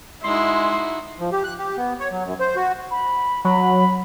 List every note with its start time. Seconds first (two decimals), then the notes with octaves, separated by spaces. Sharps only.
0.24 G#3 D#4 E4 F#4 C6
1.20 F3
1.32 G4
1.44 F#6
1.58 G4
1.77 B3
2.00 C#5
2.11 F#3
2.24 F#2
2.40 C5
2.56 F#4
2.91 B5
3.45 F#3 B5